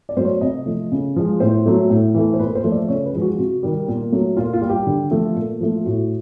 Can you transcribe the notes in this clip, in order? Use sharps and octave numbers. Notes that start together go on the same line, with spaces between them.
D5
F#3 A3 C5
C#5
C3 D#5
F3 A3
C#3
F3 G#3
A2 C5
F#3 A3
A2
E3 A3
C5
A#2 B4
C5
F3 A3
D5
C#3 C#5
B4
F3 G#3
F#4
C3 F#4
D#3 G3
A#2
F#3 A3
A#2 F4
F4
G3
G4
D3
F3 A3
A#2
F3 A3
A2 F#4